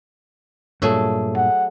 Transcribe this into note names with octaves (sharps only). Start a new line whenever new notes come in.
G2 A#2 F#3 A3 G#4
F#5